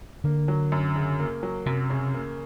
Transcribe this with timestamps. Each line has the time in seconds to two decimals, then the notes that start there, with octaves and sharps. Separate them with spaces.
0.24 D3 A#3
0.48 F#3
0.72 F#2
0.96 C#3
1.20 A#3
1.43 F#3
1.66 F#2 C3
1.90 C#3
2.14 A#3